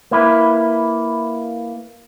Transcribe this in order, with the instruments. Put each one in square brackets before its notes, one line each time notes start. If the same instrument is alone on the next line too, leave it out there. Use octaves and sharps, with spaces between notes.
[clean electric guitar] A#3 E4 B4